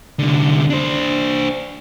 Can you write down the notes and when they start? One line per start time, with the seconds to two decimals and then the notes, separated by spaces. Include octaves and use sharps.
0.19 C2 D3
0.70 D4 C5